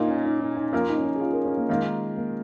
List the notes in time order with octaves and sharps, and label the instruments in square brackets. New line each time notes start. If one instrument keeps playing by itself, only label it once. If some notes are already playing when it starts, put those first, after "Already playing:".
Already playing: [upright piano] A#2 A#3 F4 A#4 [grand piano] D#4
[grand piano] C#4
D#4
D#4
D#4
[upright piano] F3 A#3 F4 A#4 [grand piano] C#4
[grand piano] D#4
C#4
D#4
G#4
F4
A#4
C#4
A#3
[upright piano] D#3 A#3 F4 A#4 [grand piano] G#3
[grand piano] A#3